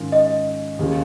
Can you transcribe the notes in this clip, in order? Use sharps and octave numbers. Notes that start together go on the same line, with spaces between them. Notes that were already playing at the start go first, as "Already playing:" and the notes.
Already playing: G#2 D#3 C#4 F4 A#4
D#5
D#2 C#3 A#3 F4 G#4